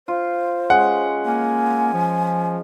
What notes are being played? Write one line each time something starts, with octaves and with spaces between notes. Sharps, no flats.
F4 C5
G#3 C#4 F#5
A#3 G#5
F3